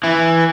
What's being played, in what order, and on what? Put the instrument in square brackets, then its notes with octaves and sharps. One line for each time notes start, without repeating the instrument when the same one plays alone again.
[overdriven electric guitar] E3